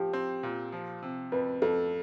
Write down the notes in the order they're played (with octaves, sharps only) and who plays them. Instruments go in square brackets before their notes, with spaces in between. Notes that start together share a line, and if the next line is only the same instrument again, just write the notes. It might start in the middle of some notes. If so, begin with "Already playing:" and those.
Already playing: [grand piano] F3 [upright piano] G4
[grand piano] C4
A#2
F3
C3
[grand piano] F2 [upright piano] B4
[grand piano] F2 [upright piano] A4